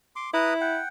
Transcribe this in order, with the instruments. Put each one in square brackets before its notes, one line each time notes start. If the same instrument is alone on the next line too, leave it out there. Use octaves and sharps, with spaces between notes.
[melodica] C6 D6
[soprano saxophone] E4 [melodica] B4 A#5 D#6
[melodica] F#5 G5